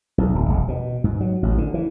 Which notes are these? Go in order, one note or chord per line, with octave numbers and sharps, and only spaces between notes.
B1
D1
E1
B2
G#2
F#3
A1
D3
E3